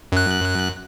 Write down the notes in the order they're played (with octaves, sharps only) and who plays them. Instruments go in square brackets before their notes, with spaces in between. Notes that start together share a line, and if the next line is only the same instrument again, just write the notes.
[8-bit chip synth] F#2 F#6